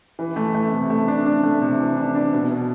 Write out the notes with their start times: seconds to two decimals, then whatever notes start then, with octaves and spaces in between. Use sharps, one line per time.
0.19 E3
0.36 A3
0.54 A3
0.72 C3
0.90 A3
1.08 D4
1.26 D4
1.43 A3
1.61 C3
1.79 E3
1.97 D4
2.15 D4
2.33 B2
2.51 B2